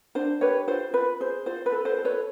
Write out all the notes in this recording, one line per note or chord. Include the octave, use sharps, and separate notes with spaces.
D4 C5
G4 B4 C#5
F4 C5
F4 B4
G#4 C5
F4 C5
B4
A4
C5
A4
B4 C#5